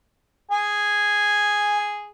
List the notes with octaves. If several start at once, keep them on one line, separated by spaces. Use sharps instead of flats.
G#4 G#5